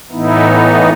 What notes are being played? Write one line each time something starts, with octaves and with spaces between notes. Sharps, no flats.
A2 E3 B3 D#4 E4